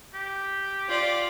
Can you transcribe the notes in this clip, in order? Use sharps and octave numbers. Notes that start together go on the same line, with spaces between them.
G4
F4 D5